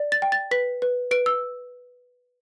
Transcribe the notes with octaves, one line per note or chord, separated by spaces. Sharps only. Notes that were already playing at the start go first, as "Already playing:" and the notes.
Already playing: D5
A6
G5
A6
B4 B6
B4
B4 D7
E6